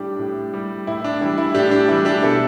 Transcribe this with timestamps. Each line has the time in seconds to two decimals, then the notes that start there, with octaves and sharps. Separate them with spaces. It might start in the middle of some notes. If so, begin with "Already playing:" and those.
Already playing: A2 G3 D4 G4
0.19 A2
0.54 G3
0.87 A2 E4
1.04 D4
1.21 E3 G3 E4
1.38 E4
1.55 A2 D4 G4
1.71 D4
1.88 E3 G3 E4
2.05 D4 G4
2.22 B2 E4 A4